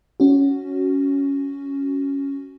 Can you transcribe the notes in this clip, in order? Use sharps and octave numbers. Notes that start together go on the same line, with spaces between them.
C#4 F#4